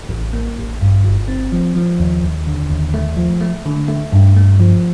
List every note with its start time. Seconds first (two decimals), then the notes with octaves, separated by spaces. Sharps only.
0.09 A1
0.33 A#3
0.57 A1
0.81 G2
1.04 G1
1.28 C4
1.52 F3
1.75 F3
1.99 D#2
2.23 D#2
2.47 D3
2.70 D#2
2.94 A3
3.17 F3
3.41 A3
3.66 D3
3.88 A3
4.12 G2
4.37 A3
4.60 F3